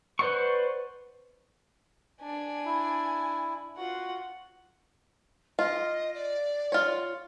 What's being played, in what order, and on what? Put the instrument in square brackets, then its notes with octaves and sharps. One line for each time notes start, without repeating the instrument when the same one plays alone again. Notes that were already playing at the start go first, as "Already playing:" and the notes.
[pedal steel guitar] B4 C5 D5 F#5 C#6
[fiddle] D4 G#5
[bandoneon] E4
[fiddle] F4 F#5 [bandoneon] F#4
[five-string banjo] F4 [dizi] D#5
[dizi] D5
[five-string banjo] F4 C#5